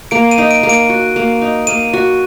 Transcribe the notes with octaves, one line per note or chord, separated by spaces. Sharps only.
A#3 D7
D#7
D#4
D7
A#3
D7
F#4
A#3
D#4
A#3 D#7
F#4